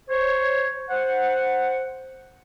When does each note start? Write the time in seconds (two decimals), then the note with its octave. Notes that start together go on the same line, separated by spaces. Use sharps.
0.09 C5 C#5
0.90 C5 F#5